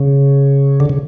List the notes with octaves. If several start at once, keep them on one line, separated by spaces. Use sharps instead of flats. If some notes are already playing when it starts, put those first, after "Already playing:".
Already playing: C#3
D3
C#3